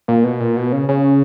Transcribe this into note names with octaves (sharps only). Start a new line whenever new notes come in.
A#2
B2
A#2
B2
C#3
C#3